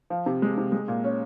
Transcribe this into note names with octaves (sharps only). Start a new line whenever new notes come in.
F3
C3
G#3
C3
G#3
A#2
C#4